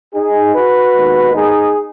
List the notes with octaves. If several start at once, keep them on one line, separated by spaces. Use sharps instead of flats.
D#4 G#4
F#4 B4
D#2 D#3 G#3 B3
D#4 G#4